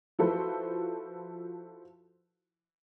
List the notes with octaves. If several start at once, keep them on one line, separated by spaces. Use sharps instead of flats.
F3 E4 F#4 A4 B4 C5